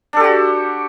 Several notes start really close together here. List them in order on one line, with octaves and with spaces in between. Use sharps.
D4 A4 G4 F#4